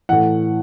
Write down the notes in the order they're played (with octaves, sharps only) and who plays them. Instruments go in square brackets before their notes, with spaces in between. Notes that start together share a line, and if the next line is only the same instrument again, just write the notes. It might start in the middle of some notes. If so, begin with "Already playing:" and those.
[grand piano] A2 E3 F#5